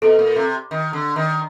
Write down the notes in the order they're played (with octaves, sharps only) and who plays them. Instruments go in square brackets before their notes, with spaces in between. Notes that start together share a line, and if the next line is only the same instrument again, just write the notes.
[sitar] B2 [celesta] A4
[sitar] A#2
C3
D#3
D3
D#3